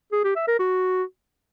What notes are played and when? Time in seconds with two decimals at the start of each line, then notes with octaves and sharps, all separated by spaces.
0.12 G#4
0.24 G4
0.36 E5
0.48 A#4
0.59 F#4